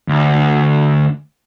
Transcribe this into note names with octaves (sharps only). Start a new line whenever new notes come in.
D2